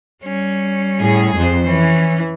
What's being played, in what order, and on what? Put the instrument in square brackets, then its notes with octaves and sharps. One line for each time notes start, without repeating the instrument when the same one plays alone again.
[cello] G3 C#4
[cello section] A2 G#4
[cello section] F2 [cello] F3 C5
[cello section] E3 [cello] C#4